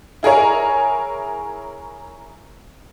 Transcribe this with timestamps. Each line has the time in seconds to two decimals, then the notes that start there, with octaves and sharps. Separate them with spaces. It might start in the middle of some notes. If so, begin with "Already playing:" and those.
0.23 E4 G#4 A#4 C#5